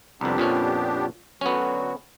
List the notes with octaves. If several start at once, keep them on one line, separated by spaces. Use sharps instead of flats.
C2 F2 B3 D4 G4
F2 A#2 C#4
D3 F#3 B3 C#4 F#4